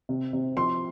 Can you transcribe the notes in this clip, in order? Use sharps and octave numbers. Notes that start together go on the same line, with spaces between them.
C3
C3
F3 C6